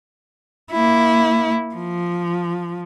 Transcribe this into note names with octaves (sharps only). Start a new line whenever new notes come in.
A#3 E4
F3